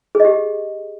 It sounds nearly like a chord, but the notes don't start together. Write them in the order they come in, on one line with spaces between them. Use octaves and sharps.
G#4 D#5 G4